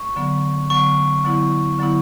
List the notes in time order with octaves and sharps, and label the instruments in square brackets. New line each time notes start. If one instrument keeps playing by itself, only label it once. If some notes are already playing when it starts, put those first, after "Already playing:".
Already playing: [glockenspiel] C#6
[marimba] D3 F#3 B3
[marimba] D3 F#3 B3 [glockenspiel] C#6
[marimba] D3 F#3 B3 E4
D3 F#3 B3 E4